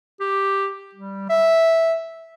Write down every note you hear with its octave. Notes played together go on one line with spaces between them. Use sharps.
G4
G3
E5